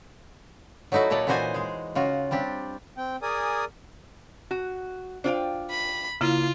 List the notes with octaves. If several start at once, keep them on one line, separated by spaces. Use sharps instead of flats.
F#3 A3 D#4 E4 F#4
A#2 D#4 A4 C#5 D5
A#2 E3 D#4 F#4 C5 G#5
G#3 G#4
C#3 F4 F#4
G3 C4 D4 G4
C4 G5
G#4 A#4 D5 G#5 D#6
F#4
D4 F4 C5 F5 G5
B5
C#3 A#3 E4 F4